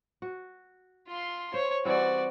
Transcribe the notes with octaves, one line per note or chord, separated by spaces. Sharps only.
F#4
F4 C6
C5 C#5
E3 G3 C4 F#4 D5